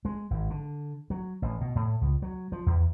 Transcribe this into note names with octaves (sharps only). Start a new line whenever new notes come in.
G#3
G#1
D3
F#3
A1
B2
A2
C#2
F#3
F3
E2